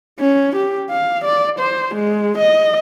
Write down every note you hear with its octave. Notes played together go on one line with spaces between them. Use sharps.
C#4
G4
F5
D5
C5
G#3
D#5